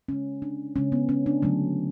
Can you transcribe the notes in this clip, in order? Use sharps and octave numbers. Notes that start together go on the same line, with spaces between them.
C#3 G#3 C#4
D4
C#3 G#3 C#4
B3
C#4
D4
D3 F#3 A3